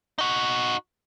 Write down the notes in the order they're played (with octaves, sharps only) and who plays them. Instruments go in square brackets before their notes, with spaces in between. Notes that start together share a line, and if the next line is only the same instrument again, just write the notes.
[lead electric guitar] D#4 F#4